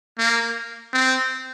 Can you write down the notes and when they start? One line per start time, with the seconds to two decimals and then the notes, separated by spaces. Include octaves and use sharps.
0.19 A#3
0.93 C4